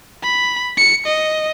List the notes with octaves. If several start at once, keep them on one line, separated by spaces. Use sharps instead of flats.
B5
C#7
D#5